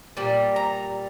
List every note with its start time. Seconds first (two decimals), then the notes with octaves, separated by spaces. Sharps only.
0.17 A#2 G3
0.56 A#5